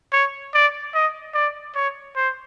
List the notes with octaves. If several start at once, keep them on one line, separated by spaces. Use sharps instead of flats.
C#5
D5
D#5
D5
C#5
C5